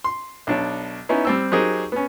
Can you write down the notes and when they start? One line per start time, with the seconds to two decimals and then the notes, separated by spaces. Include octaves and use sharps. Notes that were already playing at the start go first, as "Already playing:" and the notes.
0.04 C6
0.47 B1 D4 C#5
1.09 B3 C#4 D#4 E4
1.25 G3 C4 E6
1.52 F#3 D#4 G4 G#4 A#4 C5
1.92 B3 C#4